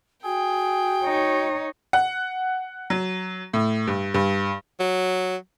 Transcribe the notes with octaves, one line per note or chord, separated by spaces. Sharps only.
F#4 G#4 G5
D#4 C#5
F#5
F#3
A2
G2
G2
F#3